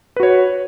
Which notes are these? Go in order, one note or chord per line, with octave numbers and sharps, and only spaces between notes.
F#4 B4 C#5